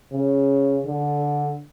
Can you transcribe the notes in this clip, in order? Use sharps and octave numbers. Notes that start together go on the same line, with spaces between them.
C#3
D3